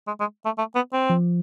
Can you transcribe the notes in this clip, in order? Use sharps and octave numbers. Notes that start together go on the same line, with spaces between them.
G#3
G#3
A3
A3
B3
C4
F3